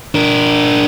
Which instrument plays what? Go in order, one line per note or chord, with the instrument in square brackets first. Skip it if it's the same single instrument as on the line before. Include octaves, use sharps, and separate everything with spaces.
[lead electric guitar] D4 A#4